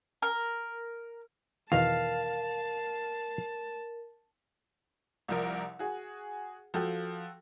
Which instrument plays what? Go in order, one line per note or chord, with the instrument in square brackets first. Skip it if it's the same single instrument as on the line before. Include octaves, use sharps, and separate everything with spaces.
[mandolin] A#4
[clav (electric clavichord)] E2 B2 D#3 [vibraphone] A#4 [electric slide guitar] F5 [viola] A5
[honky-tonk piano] C2 F3 A#4
F#4 G#4
[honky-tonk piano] F3 [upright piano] F#4 A4 G5